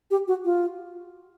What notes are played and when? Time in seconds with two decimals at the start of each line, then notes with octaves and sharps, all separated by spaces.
0.11 G4
0.28 F#4
0.45 F4